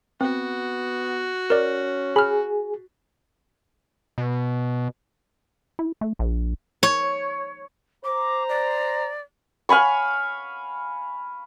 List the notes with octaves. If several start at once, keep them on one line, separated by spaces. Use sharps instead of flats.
B3 C4 F#4
C#4 A#4 D5
G#4 B5 F6
B2
E4
A3
A#1
C#5
C5 A#5 D6
D5
F5 G#5 B5 C#6